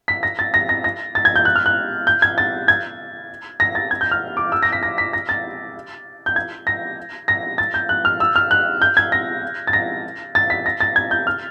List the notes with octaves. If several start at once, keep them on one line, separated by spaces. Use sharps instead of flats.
B6
A#6
A6
A#6
A#6
A#6
A6
G#6
G6
F#6
F6
F#6
G6
G#6
A6
G#6
A#6
A6
G#6
G6
F6
D6
E6
A#6
B6
A#6
B6
A#6
A6
G6
G#6
A#6
A#6
A6
G6
F#6
F6
E6
F6
F#6
G6
G#6
A#6
A6
A#6
A6
B6
A#6
A6
G#6
G6
F6